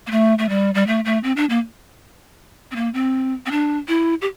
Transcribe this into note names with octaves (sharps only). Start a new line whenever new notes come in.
A#3
A3
A3
G3
G3
A3
A3
C4
D4
A#3
C4
A#3
C4
C4
D4
E4
G4